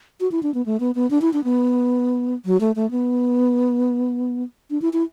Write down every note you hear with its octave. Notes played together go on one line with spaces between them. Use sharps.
F#4
E4
D4
B3
A3
B3
B3
D4
E4
D4
B3
F#3
A3
A3
B3
D4
E4
E4